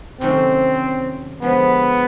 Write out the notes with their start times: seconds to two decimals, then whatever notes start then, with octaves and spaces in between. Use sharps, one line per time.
0.21 C3 D#3 F#3 A3 C4 C#4
1.42 D3 F3 G#3 B3